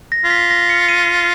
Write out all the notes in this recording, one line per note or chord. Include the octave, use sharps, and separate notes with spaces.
A#6
F4
B6
A#6
C#7
D#7